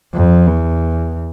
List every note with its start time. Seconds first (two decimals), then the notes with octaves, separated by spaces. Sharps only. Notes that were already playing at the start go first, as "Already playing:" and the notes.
0.14 F2
0.47 E2